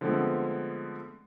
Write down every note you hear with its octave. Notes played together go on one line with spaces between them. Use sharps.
D3 F3 G#3 A3 B3 C4